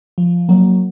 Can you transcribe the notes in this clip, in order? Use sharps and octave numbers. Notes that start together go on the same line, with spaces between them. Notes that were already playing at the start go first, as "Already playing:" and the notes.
F3
F#3 A#3